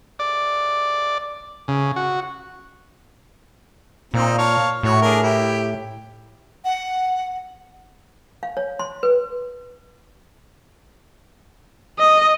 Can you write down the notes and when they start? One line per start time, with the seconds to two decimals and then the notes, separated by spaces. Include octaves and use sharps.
0.19 D5
1.68 C#3
1.96 F#4
4.14 A#2 C4 D#4 F4
4.38 C#5 F5 A5
4.83 A2 F#4 C#5
5.02 D4 G#4 A#4
5.22 E4 G4
6.65 F#5
8.43 F5
8.57 C#5
8.79 C6
9.03 B4
11.99 D#5